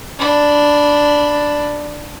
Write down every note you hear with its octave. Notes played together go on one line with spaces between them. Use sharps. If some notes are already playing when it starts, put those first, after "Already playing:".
D4 B5